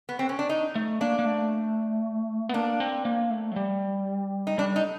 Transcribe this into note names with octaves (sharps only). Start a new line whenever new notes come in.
B3
C4
C#4
D4
D#4
A3
A#3 D4
A#3
A3
B3
A#3 D4
C4
A#3
A3
F#3
G3
D#4
G3 D4
D#4